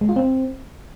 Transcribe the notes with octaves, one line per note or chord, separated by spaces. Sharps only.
G#3
F4
C4